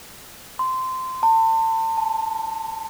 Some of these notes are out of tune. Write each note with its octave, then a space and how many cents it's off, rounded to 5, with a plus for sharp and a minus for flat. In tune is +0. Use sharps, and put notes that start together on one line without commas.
C6 -15
A5 +35
A5 -10